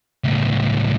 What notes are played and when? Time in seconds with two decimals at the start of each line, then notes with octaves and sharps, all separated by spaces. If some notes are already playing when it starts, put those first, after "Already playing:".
0.24 C#2 A2